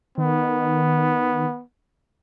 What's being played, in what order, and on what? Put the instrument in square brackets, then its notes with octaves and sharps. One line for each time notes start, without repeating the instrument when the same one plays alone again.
[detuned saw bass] D#3 [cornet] B3